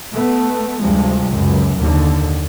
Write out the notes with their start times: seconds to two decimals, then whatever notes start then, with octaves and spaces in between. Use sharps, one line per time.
0.13 A3 B3
0.80 D2 G2 C3 F3 G#3
1.30 C#2 F#2
1.79 D#2 D3